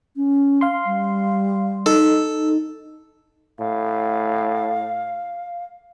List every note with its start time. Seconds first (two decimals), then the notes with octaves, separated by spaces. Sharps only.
0.16 C#4
0.61 F5 C6
0.86 G3
1.86 D#4 A4
3.59 A2 F5